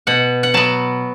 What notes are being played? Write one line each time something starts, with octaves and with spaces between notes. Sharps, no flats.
B2 F#5
F#5
F#3 B3 A5